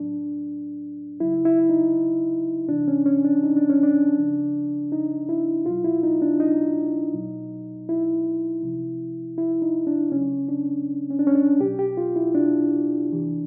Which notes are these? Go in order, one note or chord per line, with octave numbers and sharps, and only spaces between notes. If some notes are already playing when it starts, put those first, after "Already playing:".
Already playing: A2 F#3 D4
C#3 F#3 E4
E4
D#4
C3 E3 D4
C#4
C#4
D4
D#4
D4
C#4
D4
C#3 F3
D#4
E4
B2 F#3 F4
E4
D#4
D4
D#4
B2 F#3
E4
C3 F3
E4
D#4
D4
C#3 F#3 C#4
D4
C#4
D4
C#4
D4
B2 F#3 G4
G4
F4
E4
D4
C3 E3